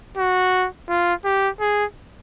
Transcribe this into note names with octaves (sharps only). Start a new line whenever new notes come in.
F#4
F4
G4
G#4